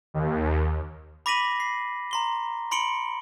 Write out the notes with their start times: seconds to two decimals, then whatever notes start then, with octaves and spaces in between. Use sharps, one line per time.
0.14 D#2
1.26 B5 D6 A#6 B6 D#7 F#7
1.60 C7
2.11 A#5 C6 G7
2.71 B5 C6 C#7 D7 F#7 G7